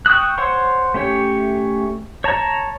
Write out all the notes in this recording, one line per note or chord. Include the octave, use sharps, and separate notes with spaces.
G5 C#6 D#6 E6 F#6
C5 C#5 F#5 C6 C#6
A3 C#4 G4 C#5
C#5 A5 A#5